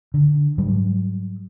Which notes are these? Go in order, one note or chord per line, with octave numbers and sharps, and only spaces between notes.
D3
G#2 F#3 G3